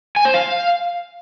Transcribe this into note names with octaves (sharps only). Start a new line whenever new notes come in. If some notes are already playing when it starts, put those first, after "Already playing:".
G#5
C5
F5